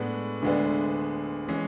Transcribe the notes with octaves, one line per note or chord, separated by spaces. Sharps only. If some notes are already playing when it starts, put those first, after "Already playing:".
Already playing: A2 G#3 B3 D4
D2 D3 G#3 B3 D4
E3 G#3 C#4